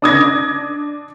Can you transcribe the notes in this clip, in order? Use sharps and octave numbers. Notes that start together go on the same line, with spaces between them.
D4 D#6 G#6 A#6